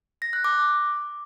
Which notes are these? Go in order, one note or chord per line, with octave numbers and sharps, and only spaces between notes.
A#6
F#6
D6